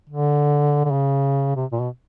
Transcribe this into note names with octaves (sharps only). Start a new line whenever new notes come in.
D3
D3
C#3
C3
A#2
B2